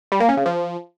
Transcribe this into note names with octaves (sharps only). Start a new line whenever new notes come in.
G3
A#3
C#4
C#3
F3